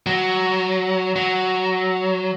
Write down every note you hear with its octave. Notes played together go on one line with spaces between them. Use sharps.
F#3
F#3